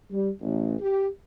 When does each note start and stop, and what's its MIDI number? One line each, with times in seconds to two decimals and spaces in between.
0.11 0.30 55
0.41 0.76 33
0.79 1.07 67